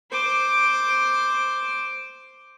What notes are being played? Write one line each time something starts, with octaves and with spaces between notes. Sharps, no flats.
C5 D6